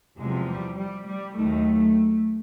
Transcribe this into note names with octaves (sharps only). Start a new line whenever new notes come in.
E2 C3 F3 G#3
G3
G3
G3
D#2 D#3 F#3 A3